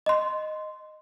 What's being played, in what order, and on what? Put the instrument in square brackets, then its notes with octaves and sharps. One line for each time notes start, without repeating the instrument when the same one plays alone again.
[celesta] D#5 C6